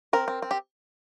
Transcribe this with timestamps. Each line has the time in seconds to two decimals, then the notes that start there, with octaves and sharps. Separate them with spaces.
0.13 C4 A#4
0.28 C4
0.42 C4
0.51 G4